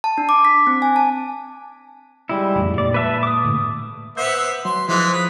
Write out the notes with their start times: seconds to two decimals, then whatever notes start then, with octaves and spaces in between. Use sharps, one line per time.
0.04 A5
0.18 D4
0.29 D6
0.45 B6
0.67 C4
0.82 G#5
0.96 A5
2.29 G3 G#3 E4
2.55 A1 F2
2.78 A#2 G#3 D5
2.94 B4 E5 A5
3.23 D6 D#6
3.44 A2 D3 A3
4.17 B3 C5 E5
4.65 F#3 C6
4.88 E3 F3 G#3
5.13 B5 D#6